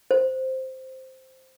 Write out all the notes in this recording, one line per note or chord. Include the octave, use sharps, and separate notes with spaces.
C5